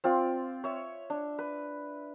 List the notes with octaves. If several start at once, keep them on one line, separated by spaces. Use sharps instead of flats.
C4 F4 D5
C#5 E5
D4
B4